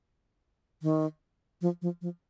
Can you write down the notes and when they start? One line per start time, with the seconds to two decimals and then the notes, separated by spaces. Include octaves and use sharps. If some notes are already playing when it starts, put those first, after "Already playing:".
0.82 D#3
1.61 F3
1.82 F3
2.01 F3